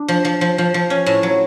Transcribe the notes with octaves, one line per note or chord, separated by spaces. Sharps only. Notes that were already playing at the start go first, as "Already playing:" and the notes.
Already playing: D4
F3
F3
F3
F3
F3
C#4
A2
F#3